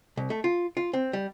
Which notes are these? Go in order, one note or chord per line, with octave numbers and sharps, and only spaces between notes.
C2
A3
F4
F4
C4
G3